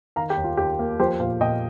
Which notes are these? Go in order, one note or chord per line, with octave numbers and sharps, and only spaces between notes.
D#3 F5 A#5
G4
D#2
F4
D#2 G4
A#3
F3 G4 C5
A#2 C5 F5
A#2 D#5 G5